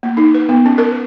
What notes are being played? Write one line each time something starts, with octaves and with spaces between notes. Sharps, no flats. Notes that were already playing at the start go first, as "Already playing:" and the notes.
A#3
D#4
B4
B3
C#4
A#4
B4